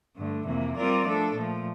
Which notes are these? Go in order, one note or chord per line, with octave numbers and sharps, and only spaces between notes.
G2 D3 A3
F2 C3 E3 A#3
G3 C4 F4 A#4 D5
F3 A3 D4 A4
A#2 F3 A3